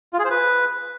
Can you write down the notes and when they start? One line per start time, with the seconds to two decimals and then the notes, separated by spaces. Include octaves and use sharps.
0.13 F4
0.19 G#4
0.25 C5
0.30 B4